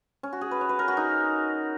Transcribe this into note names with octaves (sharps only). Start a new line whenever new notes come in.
C#4
F#4
G#4
B4
C#5
B4
A#4
F#4
D#4